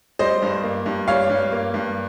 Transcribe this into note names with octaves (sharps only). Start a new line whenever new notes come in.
G3 C5 D#5
G2
A#3
G2
G3 C#5 F5
G2
A#3
G2